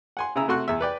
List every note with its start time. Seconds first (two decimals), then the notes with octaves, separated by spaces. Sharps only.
0.17 F#5 G#5 C6
0.36 C#3 E4 G#4 A#5 E6
0.48 C3 A3 F#4 C6 C#6 F#6
0.68 E2 E5
0.81 B4 D5 G5